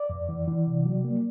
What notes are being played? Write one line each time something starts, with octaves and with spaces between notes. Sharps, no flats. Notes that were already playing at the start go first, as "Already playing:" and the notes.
Already playing: D5
F2
E3
E3
C3
F#3
A#3